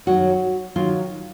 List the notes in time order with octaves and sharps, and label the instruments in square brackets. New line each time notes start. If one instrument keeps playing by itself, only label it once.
[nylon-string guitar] F#2 D#3 F#3 F#4
D#3 F#3 F4